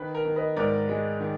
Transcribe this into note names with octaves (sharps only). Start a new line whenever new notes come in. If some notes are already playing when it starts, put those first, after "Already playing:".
Already playing: D#3 B4
A#4
D#3
B4 D#5
G#2 A#4 D5
G#3
D#3